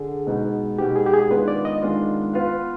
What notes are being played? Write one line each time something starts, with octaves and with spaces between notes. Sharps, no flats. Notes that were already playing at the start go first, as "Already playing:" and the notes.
Already playing: D3 G#4
B2 G#3 B3 D#4
B2 G#3 B3 D#4 G4
G#4
G4
G#4
D#3 G#3 B3 D4 F4 B4
D5
D#5
D#3 G#3 B3 D4 F4
B3 F4 B4 F5